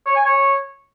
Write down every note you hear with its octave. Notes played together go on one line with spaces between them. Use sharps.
C#5
G#5
C#5